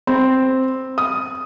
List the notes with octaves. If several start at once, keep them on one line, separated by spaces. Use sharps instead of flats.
C4
D#6